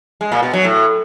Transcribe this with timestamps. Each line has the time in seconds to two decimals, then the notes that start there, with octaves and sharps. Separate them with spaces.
0.21 G#3
0.32 A#2
0.43 B2
0.53 F#3
0.64 A2